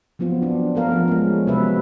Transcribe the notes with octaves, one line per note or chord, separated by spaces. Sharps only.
F3 F#3 B3 C4 F4
D4
A3 B3 A#4 F5
F3
G#3 C#4
C3 F#3 G#3 B3 B4 E5